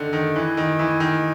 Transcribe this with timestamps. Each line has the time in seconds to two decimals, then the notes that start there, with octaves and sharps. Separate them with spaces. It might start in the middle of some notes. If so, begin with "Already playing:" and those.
Already playing: D3 D#3
0.13 D#3
0.36 E3
0.57 D#3
0.79 E3
1.00 D#3